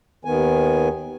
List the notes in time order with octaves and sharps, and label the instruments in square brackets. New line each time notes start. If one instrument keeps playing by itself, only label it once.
[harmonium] D#2 D#3 B3 G#5